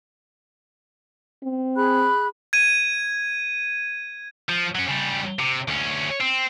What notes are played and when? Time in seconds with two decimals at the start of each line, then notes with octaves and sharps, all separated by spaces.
1.43 C4
1.76 G#4 B5 F#6
2.53 G#6 D#7
4.49 F3
4.75 F#3 C#4
4.88 C#3 G3
5.39 C3
5.68 D2 C#4
6.21 C4